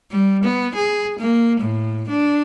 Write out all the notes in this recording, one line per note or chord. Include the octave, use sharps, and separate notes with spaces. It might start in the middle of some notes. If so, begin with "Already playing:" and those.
G3
B3
G#4
A#3
A2
D4